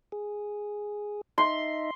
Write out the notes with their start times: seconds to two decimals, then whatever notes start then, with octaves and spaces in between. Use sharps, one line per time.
0.12 G#4
1.38 D#4 D#5 E5 C6